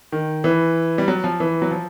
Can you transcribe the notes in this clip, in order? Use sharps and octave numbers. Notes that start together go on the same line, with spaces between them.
D#3
E3
G3
F#3
F3
E3
F#3
F3